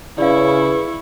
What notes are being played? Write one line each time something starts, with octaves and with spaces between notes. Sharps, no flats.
C#3 E4 G#4 B4 D5 F5 C#6